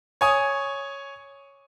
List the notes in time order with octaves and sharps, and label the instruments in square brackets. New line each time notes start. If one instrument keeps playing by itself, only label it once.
[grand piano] C#5 G#5 D#6